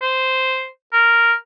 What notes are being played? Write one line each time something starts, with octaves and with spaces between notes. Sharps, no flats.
C5
A#4